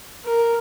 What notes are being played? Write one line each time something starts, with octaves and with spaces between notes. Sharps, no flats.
A#4